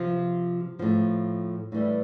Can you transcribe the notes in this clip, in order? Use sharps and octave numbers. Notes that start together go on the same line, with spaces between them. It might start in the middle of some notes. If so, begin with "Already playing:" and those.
Already playing: C3 F3
A2 F3
A2 E3 G3